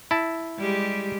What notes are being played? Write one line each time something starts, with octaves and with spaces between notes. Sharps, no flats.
E4 A5
G3 G#3 G4